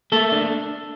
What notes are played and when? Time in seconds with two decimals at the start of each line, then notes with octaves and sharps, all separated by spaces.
0.12 A3 A#3 A4
0.32 D4